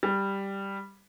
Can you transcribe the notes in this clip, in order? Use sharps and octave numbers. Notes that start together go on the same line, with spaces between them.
G3